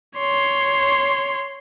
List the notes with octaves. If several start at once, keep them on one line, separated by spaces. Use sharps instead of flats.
C#5 C6